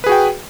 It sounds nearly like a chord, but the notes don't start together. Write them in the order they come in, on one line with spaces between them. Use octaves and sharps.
B4 G#4 F#4 G5